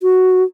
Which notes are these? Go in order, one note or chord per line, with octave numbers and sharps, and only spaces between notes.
F#4